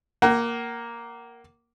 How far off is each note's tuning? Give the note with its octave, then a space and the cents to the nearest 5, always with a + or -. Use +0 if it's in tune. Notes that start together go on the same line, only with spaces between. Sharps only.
A#3 +0 F#5 +40